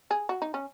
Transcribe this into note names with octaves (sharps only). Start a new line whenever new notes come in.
G#4
F#4
D#4
C#4